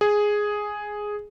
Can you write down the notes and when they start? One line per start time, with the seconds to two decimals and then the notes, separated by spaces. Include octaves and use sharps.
0.01 G#4